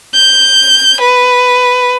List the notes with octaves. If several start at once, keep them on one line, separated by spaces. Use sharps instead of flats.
G6
B4